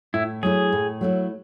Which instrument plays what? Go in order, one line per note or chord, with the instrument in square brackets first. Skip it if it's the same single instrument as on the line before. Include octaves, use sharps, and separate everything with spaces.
[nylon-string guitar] A2 [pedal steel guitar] E4
[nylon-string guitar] F#3 A3 E4 [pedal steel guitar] G#4
[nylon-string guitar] A2
F#3 A3 E4